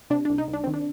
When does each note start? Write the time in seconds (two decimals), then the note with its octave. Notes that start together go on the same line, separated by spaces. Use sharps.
0.10 C3 D4
0.25 D4
0.30 C2
0.38 D#4
0.48 C2
0.53 D4
0.64 D#3 C4
0.74 D4